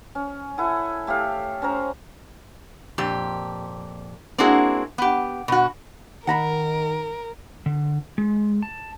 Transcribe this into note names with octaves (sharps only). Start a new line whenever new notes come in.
C#4
E4 A4 F#5 G#5
A3 G4 C#5 F5
C#4 C5 A#5
F2 A#2 G4
A#3 C4 D4 E4 F#4 G#4
B3 G4
B2 F#4
D#3 A#4 F#5 A#5 B5
D3
G#3
A5